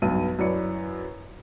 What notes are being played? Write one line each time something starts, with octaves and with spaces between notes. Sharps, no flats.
B1 G2 B2 D#7
F#2 E4 B4 C#5 D5 C#7